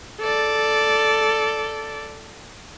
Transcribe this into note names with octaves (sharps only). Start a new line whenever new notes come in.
A4 D5